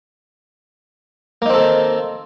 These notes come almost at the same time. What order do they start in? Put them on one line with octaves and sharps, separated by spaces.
A#3 D#4 C4 A4 D#3